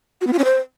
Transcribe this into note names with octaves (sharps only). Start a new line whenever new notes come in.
F#4
B3
F4
C#4
C5